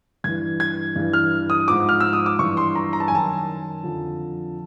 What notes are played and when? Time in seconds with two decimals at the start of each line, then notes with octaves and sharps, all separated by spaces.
0.24 G2 E3 G#6
0.60 G#6
0.96 G2 E3
1.13 F6
1.50 D#6
1.68 G#2 F3 D6
1.89 F6
2.00 E6
2.13 D#6
2.26 D6
2.39 G2 E3 C#6
2.57 C6
2.75 A#5
2.93 A#5
3.00 A5
3.08 G#5
3.11 F#2 D#3 A5
3.83 F2 D3 F3